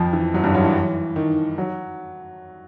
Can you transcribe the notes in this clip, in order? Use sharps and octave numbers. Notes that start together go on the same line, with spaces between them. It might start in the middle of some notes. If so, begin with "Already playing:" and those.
Already playing: F2 F3
E3
F#2 F#3
G2 G3
F#2 F#3
E3
D#3
F#3